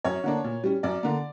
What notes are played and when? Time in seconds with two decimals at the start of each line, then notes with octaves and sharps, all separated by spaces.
0.05 F#2 C#5
0.24 D3 A#3 D4
0.44 A#2
0.64 G3 C#4
0.83 F#2 D5
1.03 D3 A#3